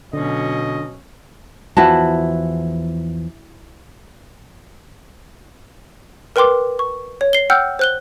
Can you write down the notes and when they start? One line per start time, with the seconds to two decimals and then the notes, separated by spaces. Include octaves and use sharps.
0.13 B2 D3 F#3 C#4 D#5
1.77 E2 E3 F3 E4 F#4 A5
6.36 A#4 B4 G5 C6 D6
6.79 C#6
7.21 C#5
7.33 C7 G7
7.50 F#5 G5 E6 F6 G6
7.79 C5 F#6 G7